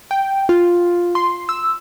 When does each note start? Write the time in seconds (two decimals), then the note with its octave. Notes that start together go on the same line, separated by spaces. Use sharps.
0.11 G5
0.49 F4
1.15 C6
1.49 E6